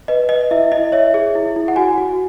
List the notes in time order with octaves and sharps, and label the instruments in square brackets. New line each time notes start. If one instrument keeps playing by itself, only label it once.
[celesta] B4 D#5
B4 D#5
E4 E5
E4 D#5
C#5 E5
G#4
E4
E4
F#5
F#4 G#5
F#4